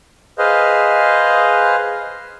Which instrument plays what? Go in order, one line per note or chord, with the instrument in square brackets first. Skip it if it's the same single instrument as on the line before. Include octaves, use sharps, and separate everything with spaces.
[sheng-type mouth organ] G#4 B4 C5 D#5 F5